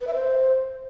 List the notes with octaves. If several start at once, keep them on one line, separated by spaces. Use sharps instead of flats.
B4
E5
C5